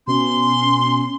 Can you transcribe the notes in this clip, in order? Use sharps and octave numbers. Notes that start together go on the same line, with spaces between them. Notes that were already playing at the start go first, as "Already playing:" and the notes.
B2 C#4 C6